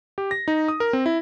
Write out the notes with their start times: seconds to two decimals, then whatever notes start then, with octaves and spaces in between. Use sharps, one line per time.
0.18 G4
0.31 A#6
0.48 D#4
0.68 D#6
0.80 A#4
0.93 C4
1.06 E4